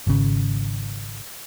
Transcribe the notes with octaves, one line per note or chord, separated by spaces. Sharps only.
G#1 C#3